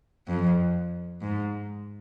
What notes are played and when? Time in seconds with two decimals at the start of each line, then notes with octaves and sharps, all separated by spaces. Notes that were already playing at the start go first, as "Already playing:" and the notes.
0.28 F2
1.22 G#2